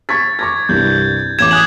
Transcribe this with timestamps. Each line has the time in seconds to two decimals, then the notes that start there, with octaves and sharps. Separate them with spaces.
0.09 C#6 G#6 A6 B6
0.39 C#6 D6 G#6 A#6
0.69 C2 G2 G6
1.39 A1 D6 G#6 E7
1.51 G#5 D#6 F#6 F#7